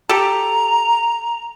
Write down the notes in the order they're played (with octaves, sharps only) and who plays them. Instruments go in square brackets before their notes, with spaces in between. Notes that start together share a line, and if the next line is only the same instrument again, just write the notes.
[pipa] G4 A4 [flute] A#5